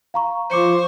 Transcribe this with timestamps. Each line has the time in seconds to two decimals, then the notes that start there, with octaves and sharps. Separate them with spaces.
0.14 F5 A#5 C#6
0.51 F3 C5 C#6 D6 C#7